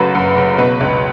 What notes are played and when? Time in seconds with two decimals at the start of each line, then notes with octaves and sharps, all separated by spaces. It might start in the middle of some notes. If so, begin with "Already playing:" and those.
Already playing: F#1 F#2 F#3 A3 B4
0.15 F#2
0.37 F#1
0.58 B2 B4
0.81 C#2